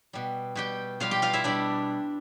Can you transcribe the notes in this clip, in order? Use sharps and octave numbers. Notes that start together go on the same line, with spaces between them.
B2 G3
B2 G3 G4 G5
B2 G3 F4 F5
G4 G5
F4 F5
E4 E5
B2 G3 D4 D5